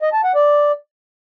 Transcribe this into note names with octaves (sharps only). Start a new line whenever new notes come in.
D#5
A5
F#5
D5